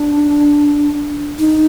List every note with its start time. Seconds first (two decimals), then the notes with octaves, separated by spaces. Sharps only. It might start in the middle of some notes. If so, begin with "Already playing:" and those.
Already playing: D4
1.38 D#4